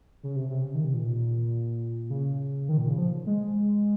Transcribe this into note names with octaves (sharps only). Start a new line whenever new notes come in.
C#3
C3
C3
C#3
D#3
C3
A#2
C#3
D#3
A#2
C#3
F3
G#3